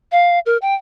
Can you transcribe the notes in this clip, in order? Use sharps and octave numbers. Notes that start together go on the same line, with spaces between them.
F5
A#4
G5